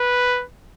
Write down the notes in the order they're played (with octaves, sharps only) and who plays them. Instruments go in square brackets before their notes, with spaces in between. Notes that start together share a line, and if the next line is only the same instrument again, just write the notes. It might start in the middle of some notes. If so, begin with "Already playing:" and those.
Already playing: [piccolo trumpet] B4